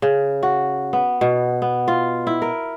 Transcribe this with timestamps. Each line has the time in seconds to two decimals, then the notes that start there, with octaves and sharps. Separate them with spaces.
0.02 C#3
0.43 F#4
0.93 B3
1.21 B2
1.62 B3
1.88 F4
2.27 E4
2.42 A#4